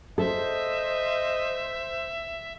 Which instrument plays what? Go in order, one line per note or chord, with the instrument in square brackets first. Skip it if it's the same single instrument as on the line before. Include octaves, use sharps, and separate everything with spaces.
[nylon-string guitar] A4 [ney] C5 [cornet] D#5 [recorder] E5